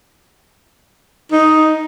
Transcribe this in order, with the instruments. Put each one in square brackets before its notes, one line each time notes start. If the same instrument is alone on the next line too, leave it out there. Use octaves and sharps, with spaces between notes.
[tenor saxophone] D#4